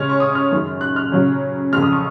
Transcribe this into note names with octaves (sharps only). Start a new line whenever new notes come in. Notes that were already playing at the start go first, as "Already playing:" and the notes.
Already playing: C#3 G#3 C#4 F6
C#6
D#6
F6
F#2 D#3 G#3
F#6
F6
C#3 F#3 C#4
F2 C#3 G#3 F6
D#6
C#6